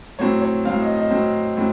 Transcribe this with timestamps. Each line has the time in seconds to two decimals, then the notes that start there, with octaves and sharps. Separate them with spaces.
0.19 A2 F#3 C4 C#5
0.42 C#5
0.65 A2 F#3 C4 F5
0.81 D#5
0.96 D#5
1.11 A2 F#3 C4
1.57 A2 F#3 C4